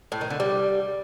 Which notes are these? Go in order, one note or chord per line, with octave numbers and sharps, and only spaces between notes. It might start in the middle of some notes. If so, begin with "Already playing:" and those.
A2
D#3
D3
G3